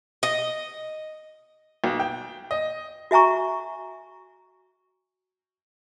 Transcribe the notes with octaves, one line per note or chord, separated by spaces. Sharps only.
D#5
B1
G5
D#5
F#4 E5 G#5 A#5 C#6